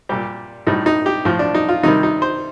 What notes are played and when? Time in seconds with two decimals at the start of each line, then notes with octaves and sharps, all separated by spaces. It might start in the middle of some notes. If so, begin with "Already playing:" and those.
0.09 A#2 G3 G4
0.67 A2 G3 D#4
0.86 D#4
1.06 G4
1.25 A2 F3
1.39 D4
1.54 D#4
1.69 F4
1.83 C3 D#3 G3 D#4
2.03 D#4
2.22 C5